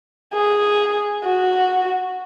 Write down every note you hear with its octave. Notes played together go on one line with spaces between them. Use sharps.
G#4
F#4